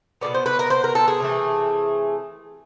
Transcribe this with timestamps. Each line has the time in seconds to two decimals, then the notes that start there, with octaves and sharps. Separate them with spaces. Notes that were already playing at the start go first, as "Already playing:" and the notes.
0.21 B2 G#3 B3 D5
0.34 C5
0.46 B4
0.59 A#4
0.70 C5
0.84 A#4
0.95 A4
1.08 G#4
1.20 C3 E3 A3